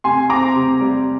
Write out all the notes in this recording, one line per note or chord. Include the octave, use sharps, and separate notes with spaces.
C3 G#5 C6
C4 A#5 D6
C3
G3